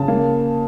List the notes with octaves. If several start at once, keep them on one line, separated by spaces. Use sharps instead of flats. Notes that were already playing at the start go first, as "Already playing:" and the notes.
Already playing: C#3 A5
A#3